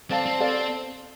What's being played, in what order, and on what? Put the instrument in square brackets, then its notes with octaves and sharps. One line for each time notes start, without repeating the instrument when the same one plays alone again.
[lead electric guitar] C4 [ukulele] A4 D5 F5 A5
[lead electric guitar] C4
[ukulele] A4 D5 F5 A5